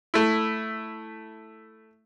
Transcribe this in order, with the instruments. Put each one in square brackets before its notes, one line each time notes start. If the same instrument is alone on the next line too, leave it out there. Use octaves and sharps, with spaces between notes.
[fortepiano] A3 E4